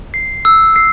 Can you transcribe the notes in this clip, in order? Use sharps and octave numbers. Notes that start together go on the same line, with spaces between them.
C7
E6
C7